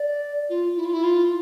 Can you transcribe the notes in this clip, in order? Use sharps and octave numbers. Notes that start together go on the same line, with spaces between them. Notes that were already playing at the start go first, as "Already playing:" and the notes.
Already playing: D5
F4
E4
F4
E4
F4